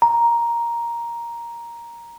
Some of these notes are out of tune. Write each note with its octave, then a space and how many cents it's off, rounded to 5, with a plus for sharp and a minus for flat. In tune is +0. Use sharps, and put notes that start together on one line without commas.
A#5 +5